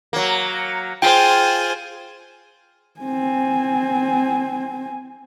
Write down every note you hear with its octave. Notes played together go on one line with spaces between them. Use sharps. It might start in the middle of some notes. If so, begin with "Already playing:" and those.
F#3 A#3
F4 G#4 C5 G5
C4 G#5